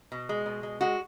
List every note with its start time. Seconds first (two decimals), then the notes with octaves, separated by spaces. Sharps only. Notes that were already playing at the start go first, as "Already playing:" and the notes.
0.12 B2
0.29 G#3
0.46 B2
0.63 G#3
0.81 G#3 F#4